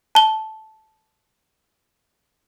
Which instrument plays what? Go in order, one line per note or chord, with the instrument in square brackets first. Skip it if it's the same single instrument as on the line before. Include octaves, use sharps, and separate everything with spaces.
[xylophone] A5 G7